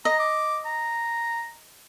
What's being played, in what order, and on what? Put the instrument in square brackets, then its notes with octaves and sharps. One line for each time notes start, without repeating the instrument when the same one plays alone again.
[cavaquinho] D#5 [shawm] A#5
[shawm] D6
A#5